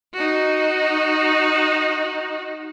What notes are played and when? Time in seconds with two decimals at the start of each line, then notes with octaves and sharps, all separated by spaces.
0.14 D#4 F#4